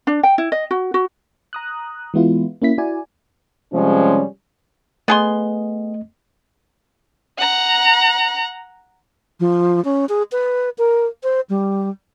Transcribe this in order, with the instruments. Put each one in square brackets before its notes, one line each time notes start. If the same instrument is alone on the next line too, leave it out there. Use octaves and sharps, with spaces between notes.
[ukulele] D4
G5
E4
D#5
F#4
F#4
[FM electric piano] A#5 D#6 F#6
E3 G#3 B3 E4 F4
A#3 C#4 E4 B6
E4 F#4 D5 G#5
[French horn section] C3 F3 G3 G#3 C#4
[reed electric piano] A3 D#5 [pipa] B3 G#4 C6
[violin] F#5 A#5
[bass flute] F3
C#4
G#4
B4
A#4
C5
G3